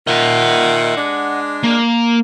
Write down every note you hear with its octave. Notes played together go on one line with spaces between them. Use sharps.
A#2 D#3 D#5 E5 F#5
G#3 D4
A#3